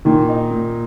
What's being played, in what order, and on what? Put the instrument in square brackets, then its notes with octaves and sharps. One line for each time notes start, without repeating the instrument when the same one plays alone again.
[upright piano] A#2 [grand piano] D#3
[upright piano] D#4
A#2